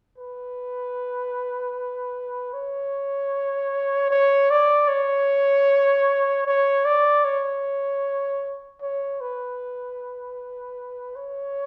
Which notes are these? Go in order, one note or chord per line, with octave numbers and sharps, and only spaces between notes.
B4
C#5
C#5
D5
C#5
C#5
D5
C#5
C#5
B4
C#5